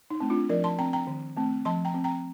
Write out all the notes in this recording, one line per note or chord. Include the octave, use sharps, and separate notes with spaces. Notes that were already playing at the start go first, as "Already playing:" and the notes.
D#4
A3 C4
D4 F4
F3 A#4 D5
A5 C6
C4 G5 A#5
G5 A#5
D#3
A3 C4
F3 A5 C6
G5 A#5
C4
G5 A#5